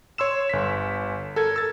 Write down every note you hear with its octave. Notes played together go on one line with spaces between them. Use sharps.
C#5 C6 E6 E7
G1 B6
A4 A#4 G#6
E6 A6